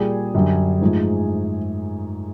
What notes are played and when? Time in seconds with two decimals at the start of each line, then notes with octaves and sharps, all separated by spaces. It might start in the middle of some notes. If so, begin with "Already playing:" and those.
Already playing: A#2 G3 G#4
0.35 F#2 D3 G3
0.81 G#2 F3 A3